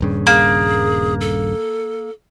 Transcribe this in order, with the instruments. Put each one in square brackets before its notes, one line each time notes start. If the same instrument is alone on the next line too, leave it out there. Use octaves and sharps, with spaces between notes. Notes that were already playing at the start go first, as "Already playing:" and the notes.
[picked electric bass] D#1 G2 C#3
[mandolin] A#3 [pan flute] G#4
[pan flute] A4